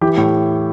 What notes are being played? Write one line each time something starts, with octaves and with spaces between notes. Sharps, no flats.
E3 G4
A2